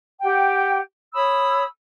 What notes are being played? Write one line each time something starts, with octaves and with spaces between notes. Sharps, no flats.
G4 F#5 G5
C#5 B5 D#6 E6